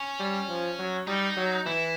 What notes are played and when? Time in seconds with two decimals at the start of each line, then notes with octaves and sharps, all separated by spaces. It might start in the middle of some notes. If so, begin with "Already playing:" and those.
Already playing: C#4
0.20 G3
0.49 F3
0.79 F#3
1.07 G3 D#4
1.37 F#3
1.66 E3 E4